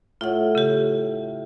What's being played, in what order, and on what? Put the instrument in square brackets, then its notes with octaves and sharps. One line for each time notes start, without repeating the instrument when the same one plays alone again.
[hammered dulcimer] A2 [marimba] F4 F#5
[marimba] C#3 G4